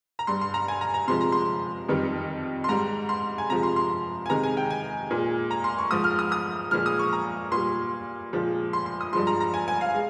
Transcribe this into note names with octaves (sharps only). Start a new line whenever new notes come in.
A#5
G2 G3 C6
C6
A#5
G#5
A#5
A#5
C3 F3 G#3 C6
A#5
C6
F2 D#3 G3
C6
G#2 G3 A#5
C6
G#5
C3 F3 G#3 A#5
C6
C6
G#5
C3 D#3 G#3 A#5
G#5
G5
G#5
A#2 G#3
A#5
C6
C#6
G#2 F3 G#3 D#6
F6
D#6
D#6
A#2 F3 G#3 F6
D#6
C#6
A#5
A#2 G3 C6
A#2 F3 G#3
C6
C6
D#6
G2 F3 G#3 C6
A#5
A#5
G#5
G#5
F5
G#3